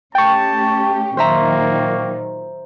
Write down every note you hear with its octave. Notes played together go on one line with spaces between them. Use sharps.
A3 C#4 G4 G5 A5 C#6
A#2 D#3 F#3 A#3 C5 E5 A#5